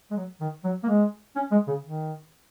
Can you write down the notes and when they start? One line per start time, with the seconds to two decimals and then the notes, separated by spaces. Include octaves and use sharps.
0.11 G#3
0.17 F#3
0.41 D#3
0.64 F#3
0.83 A#3
0.89 G#3
1.36 C#4
1.51 G#3
1.67 C#3
1.84 D#3